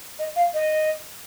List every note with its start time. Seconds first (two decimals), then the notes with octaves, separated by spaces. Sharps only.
0.19 D#5
0.36 F5
0.54 D#5